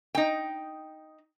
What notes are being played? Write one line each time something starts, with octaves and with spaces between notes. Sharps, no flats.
D#4 G5